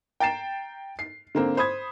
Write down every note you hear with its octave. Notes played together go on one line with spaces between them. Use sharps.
G5 A#5 A6 C7 E7
C7
D3 A#3 C4
C5 B5 D#6 G#6